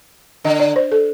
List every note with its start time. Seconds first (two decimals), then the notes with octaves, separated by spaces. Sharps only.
0.44 D3 D#5
0.60 D5
0.76 C5
0.92 A4